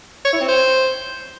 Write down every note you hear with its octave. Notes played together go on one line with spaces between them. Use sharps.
C#5
E4
C4
C5